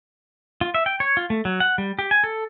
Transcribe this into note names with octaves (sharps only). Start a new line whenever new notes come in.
F4
E5
G5
C#5
F4
A3
F#3
F#5
G3
G4
G#5
A4